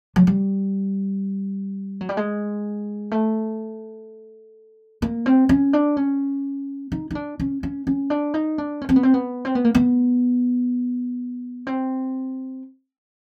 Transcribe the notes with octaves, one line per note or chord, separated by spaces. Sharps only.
F#3
G3
F#3
G3
G#3
A3
A#3
C4
C#4
D4
C#4
D#4
D#4
D4
C#4
C#4
C#4
D4
D#4
D4
C#4
C4
B3
C4
B3
C4
B3
A#3
B3
C4